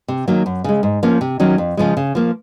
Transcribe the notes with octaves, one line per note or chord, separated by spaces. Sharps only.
C3
D#3 F#3 A#3
F#2
C#3 G#3
G#2
F3 A#3 C#4
C3
D#3 F#3 C#4
F2
C#3 F3 G#3
C#3
F3 A#3